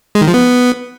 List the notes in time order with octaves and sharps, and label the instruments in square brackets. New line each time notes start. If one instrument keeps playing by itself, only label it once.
[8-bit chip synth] G#3
D#3
F3
B3